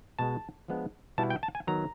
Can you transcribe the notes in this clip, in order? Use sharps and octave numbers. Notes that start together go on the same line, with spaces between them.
B2 G#3 B3 A5
F3 G#3 B3 D4
B2 G3 B3 E4 A5
G5
A5
G#5
D#3 F#3 B3 A#5